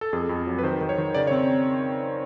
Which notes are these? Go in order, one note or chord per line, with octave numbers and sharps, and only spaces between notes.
A4
F2 G#4
F2
F#3
B4
D#3 C5
D#3
C#5
D#3
C#3 D5
C#5
C4